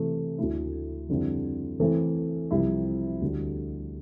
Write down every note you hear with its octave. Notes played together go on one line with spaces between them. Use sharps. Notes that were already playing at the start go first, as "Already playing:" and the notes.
Already playing: C3 E3 A3
D2 D3 A3 E4
F2 D3 G3 C4 E4
E3 A3 C4 E4 A4
C2 C3 F3 C4 E4
D2 D3 G3